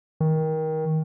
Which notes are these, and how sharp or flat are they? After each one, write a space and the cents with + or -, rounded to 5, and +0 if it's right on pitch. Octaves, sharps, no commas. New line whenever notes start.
D#3 +20